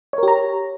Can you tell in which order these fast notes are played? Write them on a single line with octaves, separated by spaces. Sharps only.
C#5 A#4 G4 A#5